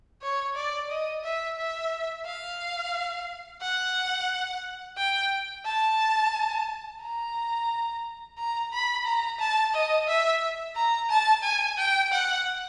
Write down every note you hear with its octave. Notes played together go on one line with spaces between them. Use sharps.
C#5
D5
D#5
E5
E5
F5
F#5
G5
A5
A#5
A#5
B5
A#5
A5
D#5
E5
A#5
A5
G#5
G5
F#5